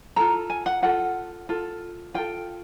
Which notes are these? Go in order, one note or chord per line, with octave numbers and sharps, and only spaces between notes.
F4 A4 A#5
G#5
F#5
F4 A4 F#5
F4 A4
F4 A4 G5